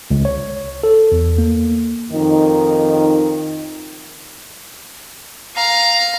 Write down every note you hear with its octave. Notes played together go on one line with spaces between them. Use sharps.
C#2
C#5
A4
E2
A#3
F2 D#3 D#4
F5 A#5